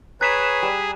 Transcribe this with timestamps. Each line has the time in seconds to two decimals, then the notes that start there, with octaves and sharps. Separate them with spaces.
0.21 G#4 B4 C#5 A#5 F#6 B6 E7
0.62 G3